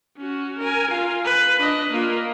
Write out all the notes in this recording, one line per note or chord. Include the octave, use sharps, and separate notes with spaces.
C#4 F#4
A#4 G#5
F4 F5
B4
D4 D#5
A#3 F4